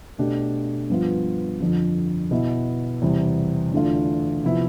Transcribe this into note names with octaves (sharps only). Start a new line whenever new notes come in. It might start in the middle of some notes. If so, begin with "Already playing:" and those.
B2 A3 D4 G4
G2 F3 B3 F4
F2 D3 F3
B2 B3 E4
E2 C3 G3 C4
E2 D3 A3 D4 F4
C3 F3 B3 E4